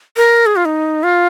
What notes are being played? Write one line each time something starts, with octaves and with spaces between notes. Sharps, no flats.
A#4
G#4
F4
D#4
F4